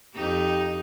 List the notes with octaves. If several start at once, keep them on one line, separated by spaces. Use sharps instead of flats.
F2 D#4 G4